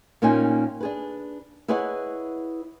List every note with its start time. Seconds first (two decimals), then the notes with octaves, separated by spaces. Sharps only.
0.22 A#2 A#3 C#4 D#4 G5 G#5
0.81 D4 G#4 B4
1.68 E4 G#4 B4 C#5 D#5 F#5